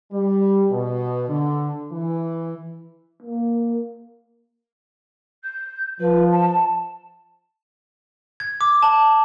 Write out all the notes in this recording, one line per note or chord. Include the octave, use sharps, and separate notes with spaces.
G3
B2
D3
E3
A#3
G6
F3 B4
A5
G#6
D6
A5